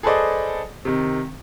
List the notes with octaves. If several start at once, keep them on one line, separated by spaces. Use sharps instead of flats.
G#4 A4 B4 C5 D5 D#5
C3 D#3